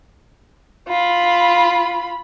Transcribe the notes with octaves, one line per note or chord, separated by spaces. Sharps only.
F4 B5